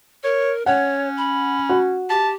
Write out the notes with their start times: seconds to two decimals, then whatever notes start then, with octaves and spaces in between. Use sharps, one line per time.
0.24 A#4 C#5
0.66 C#4 C#5 F#5
1.17 B5
1.69 F#4
2.10 G4 A5